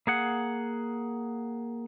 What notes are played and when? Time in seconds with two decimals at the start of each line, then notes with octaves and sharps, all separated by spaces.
0.07 A#3 G#4 F#5